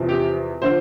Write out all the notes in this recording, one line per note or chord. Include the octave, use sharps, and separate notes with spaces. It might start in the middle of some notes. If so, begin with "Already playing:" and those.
Already playing: E2 C3 F3
G4
D3 F3 C5